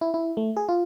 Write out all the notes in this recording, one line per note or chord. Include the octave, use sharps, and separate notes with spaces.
E4
E4
A3
G#4
F4